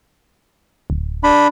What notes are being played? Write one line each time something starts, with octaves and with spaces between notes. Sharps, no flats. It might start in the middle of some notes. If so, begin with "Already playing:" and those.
D1
D4 B5